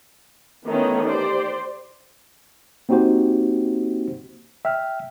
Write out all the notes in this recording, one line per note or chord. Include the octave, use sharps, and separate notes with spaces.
D#3 E3 A3 B3 C#4 D#4
G4 C5 D5
A#3 C4 D#4 F#4 G4 C5
E5 G5 F6